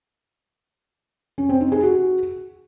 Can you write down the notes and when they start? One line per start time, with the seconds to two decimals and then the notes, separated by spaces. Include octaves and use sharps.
1.38 C#4
1.49 C4
1.61 D#4
1.72 G#4
1.83 F#4